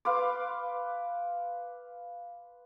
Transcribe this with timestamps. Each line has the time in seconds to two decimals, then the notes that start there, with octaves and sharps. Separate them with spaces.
0.05 B4 F5 C6 D6